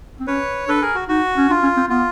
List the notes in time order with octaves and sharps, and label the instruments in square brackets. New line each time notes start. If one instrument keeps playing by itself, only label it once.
[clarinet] C4
[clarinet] C#4 [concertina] B4 C#5
[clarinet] D4 [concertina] A4 B4
[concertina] G#4 A#4
F#4
[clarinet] D#4 [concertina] F#4
[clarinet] C#4
[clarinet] D4 [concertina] F4
[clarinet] C#4
C4
[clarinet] B3 [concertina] F4